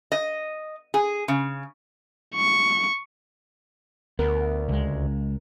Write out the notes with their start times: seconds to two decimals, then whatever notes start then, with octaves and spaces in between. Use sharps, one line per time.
0.12 D#5
0.94 G#4
1.28 C#3
2.35 C#6
4.19 D2 B3 A#4
4.69 C#2 G#3